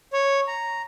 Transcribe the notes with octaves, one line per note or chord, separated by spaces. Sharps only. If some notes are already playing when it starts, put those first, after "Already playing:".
C#5
A#5